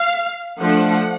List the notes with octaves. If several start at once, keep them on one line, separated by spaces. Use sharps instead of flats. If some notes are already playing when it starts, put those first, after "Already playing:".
Already playing: F5
F3 A3 D4 F#5